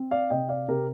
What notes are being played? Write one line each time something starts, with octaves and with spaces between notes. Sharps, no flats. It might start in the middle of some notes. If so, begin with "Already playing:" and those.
Already playing: C4
D5 F5
C3 D#5 G5
D5 F5
C3 G4 A#4